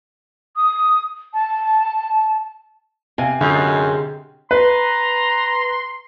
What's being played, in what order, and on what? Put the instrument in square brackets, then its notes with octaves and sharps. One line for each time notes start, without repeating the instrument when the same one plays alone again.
[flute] D#6
A5
[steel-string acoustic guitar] C3 [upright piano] F5 G#5
[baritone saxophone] F#2 [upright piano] D3 [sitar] G#3 D#4 F4
[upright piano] B4 [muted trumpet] A#5 [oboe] C6